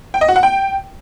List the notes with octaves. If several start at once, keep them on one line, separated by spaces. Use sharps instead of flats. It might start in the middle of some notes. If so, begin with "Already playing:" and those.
G5
D#5
F#4
F#5
G5